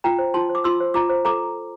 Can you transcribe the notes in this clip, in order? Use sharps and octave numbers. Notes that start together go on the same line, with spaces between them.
F4 G5 A#5
C5
F4 A5 C6
C5
D6
F4 C6 E6
C5
F4 A#5 D6
C5
A4 A#5 D6